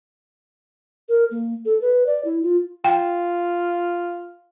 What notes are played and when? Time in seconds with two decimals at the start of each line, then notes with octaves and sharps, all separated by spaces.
1.09 A#4
1.31 A#3
1.65 A4
1.81 B4
2.07 D5
2.25 E4
2.42 F4
2.85 F4 G5